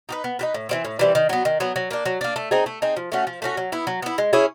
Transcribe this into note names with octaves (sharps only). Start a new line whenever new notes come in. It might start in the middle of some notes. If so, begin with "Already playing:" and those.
D#4 G4 B4
B3
D#4 G4 B4
A2
E3 G3 C4
A2
E3 G3 C4
D#3
F#3 B3
D#3
F#3 B3
F#3
A#3 D4
F#3
A#3 D4
A3
C4 D#4 G#4
A3
C4 D#4 G#4
F3
A3 C#4 F#4
F3
A3 C#4 F#4
F#3
B3 E4
F#3
B3 E4
G#3
C#4 E4 G#4